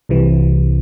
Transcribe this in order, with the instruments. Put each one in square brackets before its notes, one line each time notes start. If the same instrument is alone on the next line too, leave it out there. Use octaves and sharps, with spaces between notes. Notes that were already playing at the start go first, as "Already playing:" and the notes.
[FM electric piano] C2 C3 E3